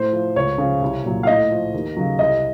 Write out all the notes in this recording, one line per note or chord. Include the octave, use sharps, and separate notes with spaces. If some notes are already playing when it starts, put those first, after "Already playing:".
Already playing: A2 C5
F3
C#2 C#5
C#3 F3
C2
A#2 F#3
F5
A2 D#5
F3
D#2
C#3 F#3
C2 D#5